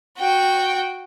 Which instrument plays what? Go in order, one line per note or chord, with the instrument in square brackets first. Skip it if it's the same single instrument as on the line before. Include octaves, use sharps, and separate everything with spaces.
[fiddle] F#4 G5